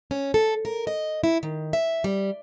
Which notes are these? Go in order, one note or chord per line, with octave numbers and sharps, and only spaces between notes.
C#4
A4
A#4
D#5
E4
D#3
E5
G3